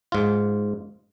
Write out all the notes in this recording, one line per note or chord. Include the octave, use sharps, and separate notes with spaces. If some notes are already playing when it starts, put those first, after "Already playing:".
G#2 F4